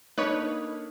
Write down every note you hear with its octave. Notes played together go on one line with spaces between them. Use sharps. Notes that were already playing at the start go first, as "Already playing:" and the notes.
A#3 D4 D#4 A4 B4 C#5